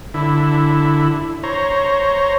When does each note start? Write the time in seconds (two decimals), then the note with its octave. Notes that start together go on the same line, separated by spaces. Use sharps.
0.14 D3 E4
1.43 C5 C#5 A#5